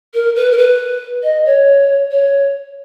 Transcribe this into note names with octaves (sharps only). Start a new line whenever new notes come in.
A#4
B4
A#4
B4
D#5
C#5
C#5